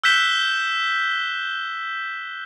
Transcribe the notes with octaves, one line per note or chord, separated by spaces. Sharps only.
E6 F#6 G6 B6 E7 G7